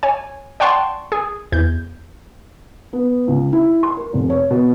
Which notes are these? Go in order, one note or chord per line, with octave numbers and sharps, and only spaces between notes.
C#5 G#5
D5 F#5 G5 A5 C6 C#6
G#4
E2 G6
B3
C#2
E4
C6
A#4
F1
C#5
B2